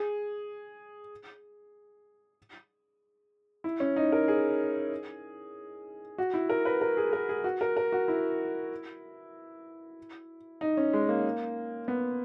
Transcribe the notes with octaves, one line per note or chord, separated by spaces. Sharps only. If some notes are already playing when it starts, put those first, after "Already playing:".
Already playing: G#4
E4
C#4
D#4
A#4
G#4
F#4
E4
A#4
B4
A#4
G#4
A#4
G#4
F#4
A#4
A#4
F#4
E4
D#4
C#4
G#3
A#3
B3